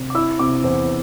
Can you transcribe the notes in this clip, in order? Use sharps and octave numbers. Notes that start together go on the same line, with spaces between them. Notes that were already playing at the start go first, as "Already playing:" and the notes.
Already playing: C3
D6
E4 E6
C3 D6
E2 C5